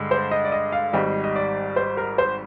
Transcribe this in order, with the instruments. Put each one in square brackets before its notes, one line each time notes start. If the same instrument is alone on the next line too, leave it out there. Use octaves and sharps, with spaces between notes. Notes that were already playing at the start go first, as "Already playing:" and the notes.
Already playing: [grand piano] G2 D3 G#3
C5
D#5
D5
D#5
F5
G#1 G#2 G3 D#5
D#5
D5
C5
A#4
C5